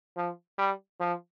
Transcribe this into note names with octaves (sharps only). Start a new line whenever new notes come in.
F3
G3
F3